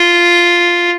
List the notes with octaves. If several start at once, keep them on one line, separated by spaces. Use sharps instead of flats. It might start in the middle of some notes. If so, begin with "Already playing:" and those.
Already playing: F4